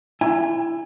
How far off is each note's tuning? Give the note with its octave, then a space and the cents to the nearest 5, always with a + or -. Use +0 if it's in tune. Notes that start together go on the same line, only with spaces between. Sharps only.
E4 +20 G#5 -35